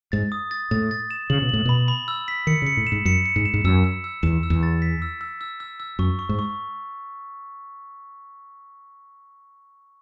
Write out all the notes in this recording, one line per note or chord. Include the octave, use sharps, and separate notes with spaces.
G#2 A6
D#6
A6
A2 A6
A6
E7
C#3 F#7
B2
A2 F#7
B2 B5
B5
E6
B6
D#3 C#7
C#3
C#7
A2
E7
G#2
F#2 C#7
C#7
G#2
E7
G#2
F#2 E6
E6
E6
E2 E7
E6
E2
A6
B6
E6
E6
E6
E6
E6
F#2 C#6
C#6
G#2
C#6